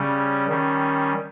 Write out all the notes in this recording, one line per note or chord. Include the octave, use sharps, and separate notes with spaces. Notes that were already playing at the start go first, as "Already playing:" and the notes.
Already playing: C#3 G3 C#4
D#3 G3 C#4